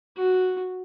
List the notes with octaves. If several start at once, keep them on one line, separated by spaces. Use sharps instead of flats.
F#4